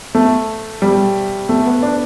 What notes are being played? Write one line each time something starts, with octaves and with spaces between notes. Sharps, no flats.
A3
G3
A3
B3
D4